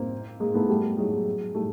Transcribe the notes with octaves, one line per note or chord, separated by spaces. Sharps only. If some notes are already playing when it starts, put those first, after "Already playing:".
Already playing: A#3 C4
G#3 A#3
A3 B3
G3 A3
F#3 G#3
G3 A3